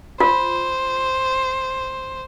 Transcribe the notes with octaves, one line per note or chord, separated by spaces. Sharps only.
F4 C5